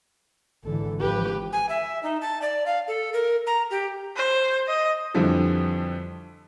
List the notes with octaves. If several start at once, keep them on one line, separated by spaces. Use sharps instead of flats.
G#1 D3 E3 A4
G#1 F3 G4 B4
G#5
E5
D#4
A5
D5
F5
A4
A#4
A#5
G4
C5
D#5
F2 D3 E3 F3 G3